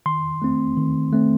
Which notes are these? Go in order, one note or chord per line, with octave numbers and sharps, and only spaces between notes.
D#3 C6
A3 C4
D#3
A3 C4